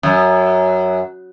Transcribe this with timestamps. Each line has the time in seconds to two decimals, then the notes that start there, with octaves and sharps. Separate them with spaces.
0.03 F#2